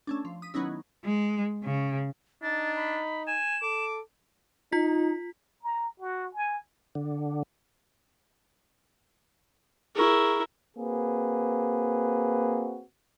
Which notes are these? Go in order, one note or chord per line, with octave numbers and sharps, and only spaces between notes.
A3 C#4 D4
F3
D#6 B6
D#3 F#3 B3 C#4 D#4 E4
G#3
C#3
D4 D#4 A6
B5
G#5 E7
A4 D6
D#4 F4 B6
A#5
F#4
G#5
D3
E4 G#4 A#4 C#6
A#3 C4 F#4 G#4 B4